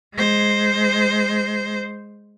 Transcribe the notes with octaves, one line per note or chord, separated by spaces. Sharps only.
G#3 C5